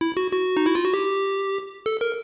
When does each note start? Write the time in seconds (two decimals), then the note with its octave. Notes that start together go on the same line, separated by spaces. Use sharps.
0.01 E4
0.17 F#4
0.32 F#4
0.57 D#4
0.66 E4
0.75 F4
0.85 F#4
0.94 G4
1.86 A4
2.01 A#4